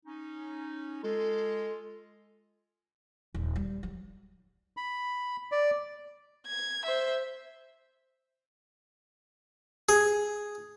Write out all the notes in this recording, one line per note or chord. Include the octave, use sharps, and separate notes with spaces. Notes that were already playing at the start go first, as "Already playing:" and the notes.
C#4 D#4
G#3 F4 A4
D#1
G3
F#3
B5
D5
G#6
C5 E5
G#4